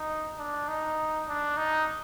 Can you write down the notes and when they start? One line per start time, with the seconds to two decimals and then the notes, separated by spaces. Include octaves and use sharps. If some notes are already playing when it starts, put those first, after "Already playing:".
Already playing: D#4
0.38 D4
0.68 D#4
1.28 D4
1.57 D#4